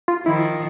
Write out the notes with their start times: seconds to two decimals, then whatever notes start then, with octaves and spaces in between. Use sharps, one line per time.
0.08 F4
0.26 D#3 F3 E4